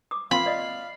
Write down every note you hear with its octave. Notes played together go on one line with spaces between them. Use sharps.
D6 D#6
A#3 C4 F4 F5 B5 C6
D5 D#5 D#6